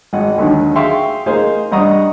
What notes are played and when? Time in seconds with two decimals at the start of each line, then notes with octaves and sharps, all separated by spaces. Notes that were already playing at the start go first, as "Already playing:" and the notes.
0.13 G#1 D#5 F#5
0.38 D#2 D3 D#3 F#3
0.75 G#4 E5 F5 G5 C6 C#6
1.26 A#3 D#4 G#4 C5 F5
1.72 G2 D#5 F#5 A#5 C#6 D#6